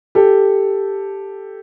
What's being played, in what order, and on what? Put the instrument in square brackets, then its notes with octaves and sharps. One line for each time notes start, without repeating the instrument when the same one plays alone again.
[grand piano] G4 A4